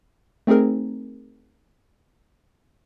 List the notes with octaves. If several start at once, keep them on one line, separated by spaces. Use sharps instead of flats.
A3 C4 D#4 G#4 A#4